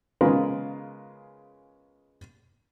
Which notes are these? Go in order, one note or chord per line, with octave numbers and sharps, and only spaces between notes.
C#3 G#3 B3 F4 A#4 B4